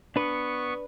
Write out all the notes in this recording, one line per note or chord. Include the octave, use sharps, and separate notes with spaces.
B3 D4 B4 C#6